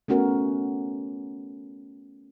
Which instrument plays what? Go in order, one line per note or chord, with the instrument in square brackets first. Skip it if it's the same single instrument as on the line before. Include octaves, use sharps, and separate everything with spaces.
[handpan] A3 B3 C#4 F#4 A#4